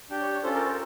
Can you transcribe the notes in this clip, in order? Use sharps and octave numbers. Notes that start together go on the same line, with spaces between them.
D4 G4 G5
C#5
C#5
C#4 F4 A4 C5
A#4
A#4